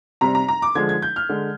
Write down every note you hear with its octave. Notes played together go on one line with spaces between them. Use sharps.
C3 G3 A#5
A#5
A#5
D6
D3 F3 G#3 G#6
G#6
G6
F6
D3 G#3